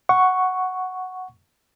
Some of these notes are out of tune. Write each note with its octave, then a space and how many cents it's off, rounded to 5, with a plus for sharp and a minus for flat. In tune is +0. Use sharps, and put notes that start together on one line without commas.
F#5 +0 C#6 +0